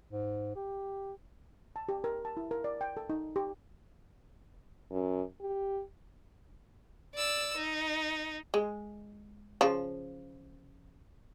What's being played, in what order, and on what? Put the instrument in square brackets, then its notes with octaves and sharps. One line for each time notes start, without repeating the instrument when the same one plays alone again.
[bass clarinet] G#2
G4
[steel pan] A5
G4
A#4
A5
E4
A#4
D5
G5
A4
D#4
G4
[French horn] F#2
G4
[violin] D5 E6
D#4
[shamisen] G#3
C#3 F3